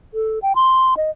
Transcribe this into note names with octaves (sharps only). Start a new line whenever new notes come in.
A4
G5
C6
D#5